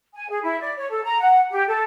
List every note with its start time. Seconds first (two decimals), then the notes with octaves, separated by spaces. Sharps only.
0.14 G#5
0.29 G#4
0.43 E4
0.61 D5
0.77 C#5
0.89 A4
1.03 A#5
1.20 F#5
1.51 G4
1.67 A4